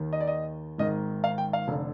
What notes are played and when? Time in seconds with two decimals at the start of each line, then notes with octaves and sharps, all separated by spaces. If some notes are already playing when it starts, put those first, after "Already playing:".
Already playing: D#2 D#3
0.13 D#5
0.20 D5
0.28 D#5
0.78 G#1 G#2 D#3 D#5
1.24 F5
1.38 G5
1.53 F5
1.68 F1 D3